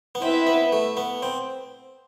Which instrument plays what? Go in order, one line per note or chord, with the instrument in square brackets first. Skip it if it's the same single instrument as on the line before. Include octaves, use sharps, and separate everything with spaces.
[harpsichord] B3
[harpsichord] C4 [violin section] E4 B4 E5
[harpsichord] B3
A3
B3
C4